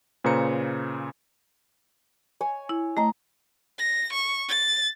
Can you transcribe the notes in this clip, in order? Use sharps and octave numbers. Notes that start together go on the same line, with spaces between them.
A#2 C#3 B4 C5 A#5 C#7
C#5 G#5
E4
A3 D#5 A#5
A#6
C#6
A6